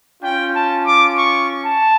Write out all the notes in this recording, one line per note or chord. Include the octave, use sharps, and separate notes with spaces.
C#4 F4 G5
A5
D6
C#6
A5